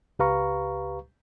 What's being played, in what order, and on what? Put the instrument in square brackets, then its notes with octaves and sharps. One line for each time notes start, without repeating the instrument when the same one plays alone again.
[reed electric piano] C#2 G4 B4 F5 A#5 C#6